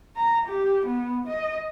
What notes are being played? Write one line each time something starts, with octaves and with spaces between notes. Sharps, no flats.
A#5
G4
B3
D#5